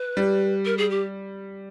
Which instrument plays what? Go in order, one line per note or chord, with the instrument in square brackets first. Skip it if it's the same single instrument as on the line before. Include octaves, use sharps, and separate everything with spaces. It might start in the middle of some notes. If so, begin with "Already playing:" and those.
Already playing: [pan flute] B4
[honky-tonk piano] G3
[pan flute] A#4
G#4
G4